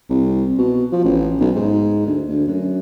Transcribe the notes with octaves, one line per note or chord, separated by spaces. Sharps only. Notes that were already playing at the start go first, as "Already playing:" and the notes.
C2
B2
F3
A1
B1
G#2
D2
D2
F#2